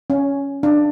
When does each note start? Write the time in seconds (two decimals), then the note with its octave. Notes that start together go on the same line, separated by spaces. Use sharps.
0.10 C#4
0.63 D4